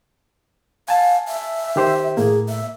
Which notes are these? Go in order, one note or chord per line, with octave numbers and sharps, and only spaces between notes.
F5 G#5 A5
E5
D#3 G4 C5
A2 A#3 G#4
E5